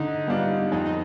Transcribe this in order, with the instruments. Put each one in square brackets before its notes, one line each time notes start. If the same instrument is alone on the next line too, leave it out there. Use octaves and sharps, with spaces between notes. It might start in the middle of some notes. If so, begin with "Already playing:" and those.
Already playing: [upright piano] D3 [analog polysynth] D#4
[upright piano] G3 B3 D4 F4
[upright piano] F2 [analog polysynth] D#4
[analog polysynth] D#4